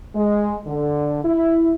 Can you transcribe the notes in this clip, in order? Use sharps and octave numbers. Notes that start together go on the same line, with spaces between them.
G#3
D3
E4